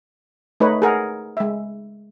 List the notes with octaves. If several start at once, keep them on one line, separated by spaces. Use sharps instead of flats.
A3 D#4 B4 C#5
G#4 A#4 F#5
G#3 E5